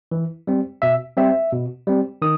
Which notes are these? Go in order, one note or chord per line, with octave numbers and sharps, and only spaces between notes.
E3
G3 C4
B2 E5
G3 C4 E5
B2
G3 C4
D#3 D#6